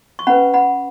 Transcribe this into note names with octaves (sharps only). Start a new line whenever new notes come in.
C#6
C#4 B4 F#5 B5
F#5 B5